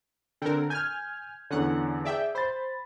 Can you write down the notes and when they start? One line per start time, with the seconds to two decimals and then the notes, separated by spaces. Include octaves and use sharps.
0.42 D3 C4 A4 A#4
0.70 G#5 F6 G6 G#6
1.50 E2 D3 C#4 F#5
2.05 G#4 D5 E5 G5
2.35 C5 B5 A6